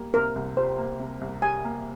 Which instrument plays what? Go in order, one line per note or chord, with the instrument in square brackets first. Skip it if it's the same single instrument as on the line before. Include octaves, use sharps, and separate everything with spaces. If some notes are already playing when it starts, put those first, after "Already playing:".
Already playing: [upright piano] G3 A#3
[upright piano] C3 [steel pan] A#4
[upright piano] C2
[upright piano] G3 [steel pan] C5
[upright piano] A#3
C3
C2
[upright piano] G3 [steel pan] G#5
[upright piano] A#3